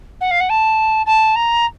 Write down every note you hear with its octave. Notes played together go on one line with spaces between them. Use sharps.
F#5
F5
F#5
A5
A5
A#5